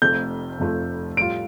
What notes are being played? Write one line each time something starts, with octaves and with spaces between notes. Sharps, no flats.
F1 F2 F3 A3 G6
F1 F2 F3 A3
A2 G3 F4 D7